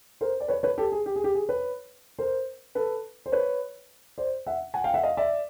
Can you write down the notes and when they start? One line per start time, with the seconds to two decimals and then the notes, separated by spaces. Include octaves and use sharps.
0.21 A#4 C5
0.40 D5
0.48 B4 C#5
0.63 B4 C#5
0.78 G4 A4
0.92 G#4
1.06 G4
1.16 G#4
1.24 G4
1.34 G#4
1.49 B4 C#5
2.19 A#4 C5
2.75 A4 B4
3.26 C5
3.32 B4 C#5
4.18 C5 D5
4.47 E5 F#5
4.74 F#5 G#5
4.84 F5 G5
4.93 E5 F#5
5.03 D#5 F5
5.17 D5 E5